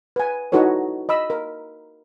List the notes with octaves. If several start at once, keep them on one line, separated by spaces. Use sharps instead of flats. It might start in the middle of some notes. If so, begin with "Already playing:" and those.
B4 G#5
D#4 E4 F#4 A4 B4 C#5
D#5 B5 E6
A#4